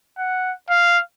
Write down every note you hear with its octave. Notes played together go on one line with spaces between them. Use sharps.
F#5
F5